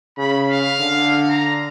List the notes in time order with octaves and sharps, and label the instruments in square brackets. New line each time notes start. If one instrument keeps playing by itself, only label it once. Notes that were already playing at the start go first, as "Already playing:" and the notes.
[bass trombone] C#3 [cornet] B5
[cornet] F5
[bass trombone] D3
[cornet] A#5